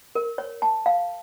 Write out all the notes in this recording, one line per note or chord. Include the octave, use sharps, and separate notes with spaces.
A#4
C#5
A5
F5